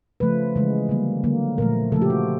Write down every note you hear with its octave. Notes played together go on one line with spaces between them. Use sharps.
C#3 F3 A3 B4
C#3 E3 G#3
D3 G3 A#3
D3 F#3 A#3
A#2 F3 A3 A#4
C#3 F3 A3 A4
G4
F#4